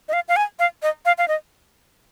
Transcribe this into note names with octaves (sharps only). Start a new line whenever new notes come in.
D#5
F5
F5
G#5
F5
D#5
F5
F5
D#5